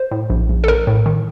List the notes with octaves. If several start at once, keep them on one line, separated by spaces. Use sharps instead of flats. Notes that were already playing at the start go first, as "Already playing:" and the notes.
Already playing: C5
A2
A#1
A#1
A4
A1 A#4
A2
D#3